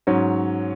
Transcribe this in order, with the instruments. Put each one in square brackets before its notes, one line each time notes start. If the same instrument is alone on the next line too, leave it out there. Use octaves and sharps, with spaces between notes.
[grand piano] G#2 F#3 C#4